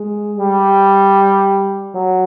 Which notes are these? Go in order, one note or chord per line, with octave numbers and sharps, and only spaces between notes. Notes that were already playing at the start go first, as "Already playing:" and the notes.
Already playing: G#3
G3
F#3